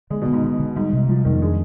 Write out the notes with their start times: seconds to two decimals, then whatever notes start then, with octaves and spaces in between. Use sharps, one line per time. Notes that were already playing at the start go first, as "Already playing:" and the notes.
0.10 D3 G#3
0.22 B2
0.27 D3
0.33 G#2
0.44 G#2 D3
0.59 D3
0.76 G#2 G3
0.93 C3
1.09 F3 G3
1.25 F2 D#3
1.41 G#3 D4